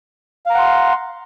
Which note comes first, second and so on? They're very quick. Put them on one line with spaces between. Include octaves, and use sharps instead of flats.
F5 A#5 F#5 C6